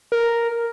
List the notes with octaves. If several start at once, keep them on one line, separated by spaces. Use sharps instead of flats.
A#4